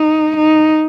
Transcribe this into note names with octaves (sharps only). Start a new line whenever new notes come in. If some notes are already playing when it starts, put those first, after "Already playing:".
Already playing: D#4
D#4